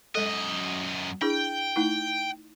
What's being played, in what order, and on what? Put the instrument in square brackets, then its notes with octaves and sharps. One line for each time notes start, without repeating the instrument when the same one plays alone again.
[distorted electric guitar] F#2 D#5 [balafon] G#3 A4
[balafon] D4 E4 G#4 [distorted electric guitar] G5
[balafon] A3 D#4 E4